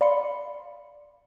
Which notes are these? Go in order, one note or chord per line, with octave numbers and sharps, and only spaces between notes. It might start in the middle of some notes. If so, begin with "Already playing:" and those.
D5 F5 B5 C6 C#7